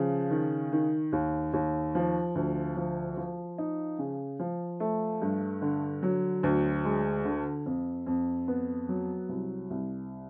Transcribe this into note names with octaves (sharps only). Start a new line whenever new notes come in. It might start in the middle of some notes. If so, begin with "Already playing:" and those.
Already playing: C#3 F3
D#3
D#3
D#2
D#2
F3
D2
F3
F3
D#4
C#3
F3
A3
G2
D3
F#3
D2
G#3
D3
F2
F2
B3
F#3
C2
C2